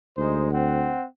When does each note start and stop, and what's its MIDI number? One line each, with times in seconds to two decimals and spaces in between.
0.18 0.93 38
0.18 0.49 56
0.18 0.49 63
0.18 0.49 72
0.52 1.06 60
0.52 1.06 78